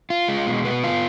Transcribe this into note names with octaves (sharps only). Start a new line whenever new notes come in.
F4
G#3
B2
B3
F4